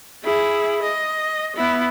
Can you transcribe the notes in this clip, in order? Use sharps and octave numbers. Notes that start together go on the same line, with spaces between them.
E4 G#4
D#5
B3 E4